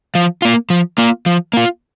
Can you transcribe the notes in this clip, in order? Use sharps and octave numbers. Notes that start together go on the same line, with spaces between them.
F3
A#3 F4
F3
A#3 F4
F3
A#3 F4